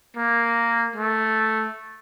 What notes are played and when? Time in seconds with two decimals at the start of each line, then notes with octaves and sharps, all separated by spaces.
0.17 A#3
0.96 A3